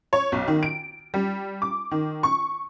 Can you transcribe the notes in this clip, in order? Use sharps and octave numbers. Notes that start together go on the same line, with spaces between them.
C#5
B1
D#3
D7
G3
D6
D#3
C#6